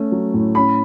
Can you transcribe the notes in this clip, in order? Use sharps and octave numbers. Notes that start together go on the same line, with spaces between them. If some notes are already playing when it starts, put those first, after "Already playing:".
Already playing: A3 C#4
F#3
A2
C#4 B5